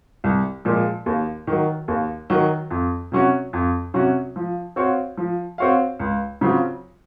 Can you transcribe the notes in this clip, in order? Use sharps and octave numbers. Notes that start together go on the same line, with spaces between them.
C2
A#2 F3 G#3
D#2
D#3 F#3
D#2
D#3 F#3
F2
C3 F#3 C#4 F#4
F2
C3 F#3 C#4 F#4
F3
C4 F#4 C#5 F5
F3
C4 F#4 C#5 F5
C#2
C#3 F#3 C4 F4